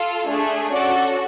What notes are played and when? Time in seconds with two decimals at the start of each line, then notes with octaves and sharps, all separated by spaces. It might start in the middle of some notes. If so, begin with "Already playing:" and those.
Already playing: F4 A4
0.27 A3 D4 G#4
0.73 C#4 F#4 A4 D5